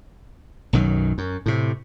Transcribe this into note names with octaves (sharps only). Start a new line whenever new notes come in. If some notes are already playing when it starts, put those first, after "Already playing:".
B1 F#2 D#3 F#3
F#2
A2 C3